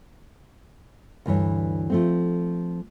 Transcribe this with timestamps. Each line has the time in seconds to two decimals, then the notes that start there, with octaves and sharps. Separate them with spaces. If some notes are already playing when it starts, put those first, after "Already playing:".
1.26 D2 G2 E3 C#5
1.90 F3 A3 C4